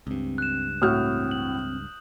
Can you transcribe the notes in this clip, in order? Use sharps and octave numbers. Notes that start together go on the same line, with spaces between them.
C#2 G2 C4
F#6 E7
A2 C4 F#4 D#6 F6 G6
F#7